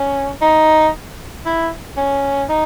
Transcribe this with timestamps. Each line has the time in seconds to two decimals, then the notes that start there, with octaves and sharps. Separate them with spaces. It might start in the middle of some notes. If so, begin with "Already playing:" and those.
Already playing: C#4
0.42 D#4
1.46 E4
1.97 C#4
2.49 D#4